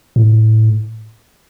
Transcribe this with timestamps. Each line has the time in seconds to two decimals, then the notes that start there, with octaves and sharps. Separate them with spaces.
0.16 A2